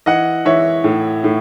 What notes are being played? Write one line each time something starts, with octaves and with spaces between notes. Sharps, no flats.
E3 D#5 F#5
E3 C#5 E5
A2
A2